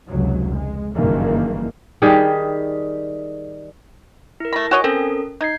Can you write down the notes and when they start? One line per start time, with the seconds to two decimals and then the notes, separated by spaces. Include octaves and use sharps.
0.10 F1 C#2 F#3
0.55 G#3
0.94 F#1 G2 D#3 E3 A#3
2.02 D#3 G3 G4 G#4
4.40 E4 A#4
4.53 A3 B5 A#6
4.71 F#4 C#5 D#5 G#5
4.84 C4 C#4 A4 A#4
5.41 D#4 G6 G#6 C7